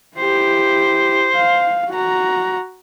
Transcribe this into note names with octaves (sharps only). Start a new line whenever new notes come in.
E4 G4 C5
F5
F#4 A#5